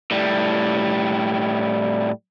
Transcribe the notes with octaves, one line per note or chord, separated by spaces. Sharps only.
A2 G3